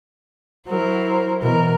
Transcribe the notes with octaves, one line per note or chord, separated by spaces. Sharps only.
F#3 E4 A#4 C5
B2 E3 A#4